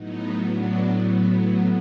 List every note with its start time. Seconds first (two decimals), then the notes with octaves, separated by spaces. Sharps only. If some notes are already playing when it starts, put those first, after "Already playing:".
Already playing: A2 F#3 B3 D#4
0.48 D4